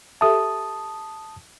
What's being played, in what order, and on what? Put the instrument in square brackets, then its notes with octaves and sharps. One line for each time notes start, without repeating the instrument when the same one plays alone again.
[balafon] G4 A4 E5 [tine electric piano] A5 D#6